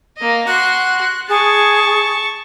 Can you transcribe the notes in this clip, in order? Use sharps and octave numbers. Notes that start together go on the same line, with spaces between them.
A#3 D#5
F#4 C6 F#6
G#4 A5 C#6